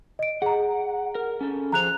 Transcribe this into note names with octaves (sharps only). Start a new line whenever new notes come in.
D#5 D7
G#4 F#5 A#5
A#4
C#4 A4
F3 G#4 C5 A#5 F#6 F7